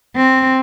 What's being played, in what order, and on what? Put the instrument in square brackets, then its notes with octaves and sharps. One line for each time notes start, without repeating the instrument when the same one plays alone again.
[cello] C4